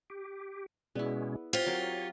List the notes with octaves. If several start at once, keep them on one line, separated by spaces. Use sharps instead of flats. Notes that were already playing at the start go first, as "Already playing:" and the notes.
G4
B2 G#3 B3 C#4 E4 G#4 D5
F4 G4 C5 C#5
F#3 C4 A#4